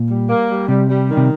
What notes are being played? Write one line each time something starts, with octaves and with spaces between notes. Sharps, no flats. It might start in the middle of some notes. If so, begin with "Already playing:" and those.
Already playing: A#2
G3
A#3
G3
C3 G3
G3
D#3
C3